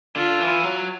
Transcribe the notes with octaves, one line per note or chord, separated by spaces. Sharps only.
D3 F4
E3
F#3